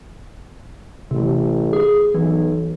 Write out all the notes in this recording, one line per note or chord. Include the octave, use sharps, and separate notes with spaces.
A1 C3
G#4
B1 E3